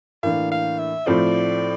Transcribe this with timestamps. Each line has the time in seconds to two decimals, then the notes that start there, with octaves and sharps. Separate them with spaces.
0.23 A2 E3 A#3 D4 F5
0.51 F5
0.79 E5
1.06 A2 F3 A3 C4 F4 D5